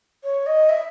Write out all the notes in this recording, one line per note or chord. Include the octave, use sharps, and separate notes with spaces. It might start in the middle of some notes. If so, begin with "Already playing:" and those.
C#5
D#5
E5